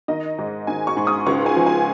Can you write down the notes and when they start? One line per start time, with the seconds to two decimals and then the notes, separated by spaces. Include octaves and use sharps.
0.08 D#3 D#5
0.38 G#2
0.67 D#3 G#5
0.87 C#6
0.97 G#2
1.07 D#6
1.26 C#2 C#6
1.46 G#5
1.56 F3
1.66 G#5